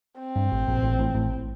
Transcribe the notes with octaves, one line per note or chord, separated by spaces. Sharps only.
C4
G2
A1 A2
A#1 A#2
A1 A2
A1 A2
A1 A2